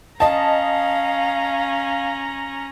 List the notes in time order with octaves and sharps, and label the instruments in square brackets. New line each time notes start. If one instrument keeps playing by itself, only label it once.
[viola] C#4 A#5 [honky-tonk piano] D#5 A5 [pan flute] F5